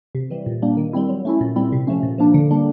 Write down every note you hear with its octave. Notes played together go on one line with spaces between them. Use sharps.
C3
E3 G3
A#2
G3 A#3 D4
D#3
G3 C4 E4
F#3
A3 C#4 E4
A#2
G3 C4 E4
C3
F3 A3 C#4
A#2
F3 A#3 D4
D3
G3 A#3 D4